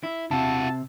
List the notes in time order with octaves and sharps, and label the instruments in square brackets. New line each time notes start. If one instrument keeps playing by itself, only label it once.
[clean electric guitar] E4
[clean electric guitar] C3 [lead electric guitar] E4 F#4 [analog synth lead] A5